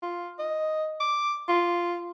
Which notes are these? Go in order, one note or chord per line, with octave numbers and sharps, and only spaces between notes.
F4
D#5
D6
F4